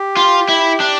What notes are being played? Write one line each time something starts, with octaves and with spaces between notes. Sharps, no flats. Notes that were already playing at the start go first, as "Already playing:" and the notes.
Already playing: G4
F4
E4
D4